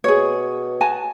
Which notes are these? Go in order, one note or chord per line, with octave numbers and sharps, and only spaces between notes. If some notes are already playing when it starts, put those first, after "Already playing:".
B2 G#4 C#5
F#4 G#5 A5